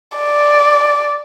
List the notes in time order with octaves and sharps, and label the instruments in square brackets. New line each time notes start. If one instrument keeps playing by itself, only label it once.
[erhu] D5